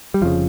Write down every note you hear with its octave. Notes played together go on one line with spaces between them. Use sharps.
G3
F1 F2 C#3 F3